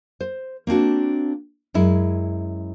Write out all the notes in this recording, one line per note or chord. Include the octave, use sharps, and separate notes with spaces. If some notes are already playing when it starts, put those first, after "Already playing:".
C5
A#3 C4 D4 F#4
F#2 G#3 E4